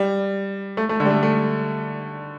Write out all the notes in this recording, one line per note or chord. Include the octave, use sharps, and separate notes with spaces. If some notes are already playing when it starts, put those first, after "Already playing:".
Already playing: G3
A3
A3
D3
G3
A3
A3